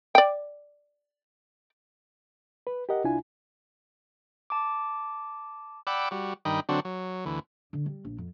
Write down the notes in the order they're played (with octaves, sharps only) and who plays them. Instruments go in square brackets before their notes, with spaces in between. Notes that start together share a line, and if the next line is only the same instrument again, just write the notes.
[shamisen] D5 G5
[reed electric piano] B4
G4 A#4 D#5 F#5
C2 D4 E4 F4 G#5
[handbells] A5 D6
[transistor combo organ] D5 F#5 G5 B5 D6 E6
G3 F#4
G2 D#3 D#5 G5 B5
D3 F#3 C4 D4 F#4
F#3
D2 E3
[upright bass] D3
G3
A#1
F2